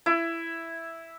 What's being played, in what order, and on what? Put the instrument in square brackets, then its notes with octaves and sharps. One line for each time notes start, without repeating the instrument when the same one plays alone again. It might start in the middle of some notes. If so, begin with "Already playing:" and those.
[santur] E4